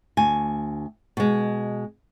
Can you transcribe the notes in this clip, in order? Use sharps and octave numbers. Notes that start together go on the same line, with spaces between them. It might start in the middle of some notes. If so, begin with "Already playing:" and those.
D2 G#5
B2 G#3